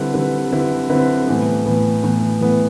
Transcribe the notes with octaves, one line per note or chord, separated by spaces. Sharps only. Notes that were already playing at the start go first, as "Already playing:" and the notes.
Already playing: D3 G3 C4 E4 B4
D3 G3 C4 E4 B4
D3 G3 C4 E4 B4
D3 G3 C4 E4 B4
A2 E3 B3
A2 E3 B3
A2 E3 B3
A2 E3 B3